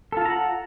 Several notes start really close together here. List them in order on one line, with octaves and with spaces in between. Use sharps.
A4 F4 A5 A#5 F#5